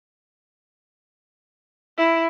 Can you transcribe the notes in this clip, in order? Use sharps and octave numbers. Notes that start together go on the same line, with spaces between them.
E4